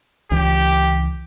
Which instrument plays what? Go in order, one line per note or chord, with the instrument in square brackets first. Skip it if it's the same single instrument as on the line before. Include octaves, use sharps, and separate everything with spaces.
[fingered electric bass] C#2 E3 [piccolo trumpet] G4